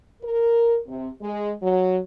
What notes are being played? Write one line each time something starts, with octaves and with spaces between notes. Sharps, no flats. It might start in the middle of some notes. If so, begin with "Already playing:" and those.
A#4
C3
G#3
F#3